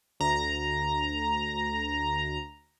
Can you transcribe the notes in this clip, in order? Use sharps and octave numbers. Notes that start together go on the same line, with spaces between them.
D2 A#5